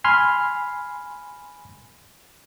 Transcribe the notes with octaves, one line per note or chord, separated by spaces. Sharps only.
G#5 B5 C6 F6